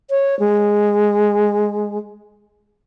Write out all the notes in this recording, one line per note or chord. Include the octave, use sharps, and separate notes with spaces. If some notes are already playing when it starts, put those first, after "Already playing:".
C#5
G#3